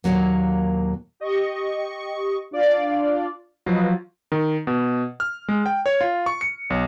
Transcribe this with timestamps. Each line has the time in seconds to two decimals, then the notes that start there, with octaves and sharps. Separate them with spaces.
0.04 D#2 A#2 F#3 A#3
1.20 G4 D#5 C#6
2.51 D4 F4 D5
3.66 F3 F#3 F4 B4 D#5
4.32 D#3
4.67 B2
5.20 F6
5.48 G#3
5.66 G5
5.86 C#5
6.01 F4
6.26 C#6
6.41 C#7
6.70 B1